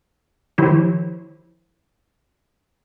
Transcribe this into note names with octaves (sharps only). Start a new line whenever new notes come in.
D#3 F3 E4 G4 C5 C#5